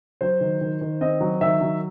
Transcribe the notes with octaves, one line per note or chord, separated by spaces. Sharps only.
F#3 C5
D#3
D#3
D#3
C4 D#5
F#3
D#3 E5
F#3